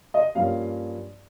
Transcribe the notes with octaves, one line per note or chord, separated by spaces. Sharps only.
D#5
G2 F3 A#3 C#4 F5